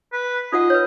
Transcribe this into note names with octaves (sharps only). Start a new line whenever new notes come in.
B4
D#4 F4 D#5 F#5
B4 C#5